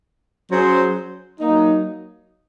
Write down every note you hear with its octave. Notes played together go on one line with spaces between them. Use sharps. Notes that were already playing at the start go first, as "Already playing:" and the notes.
F#3 C#4 G#4 C5
F#3 A#3 D#4